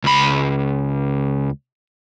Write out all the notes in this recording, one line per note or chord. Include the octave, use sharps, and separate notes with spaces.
C#2 B5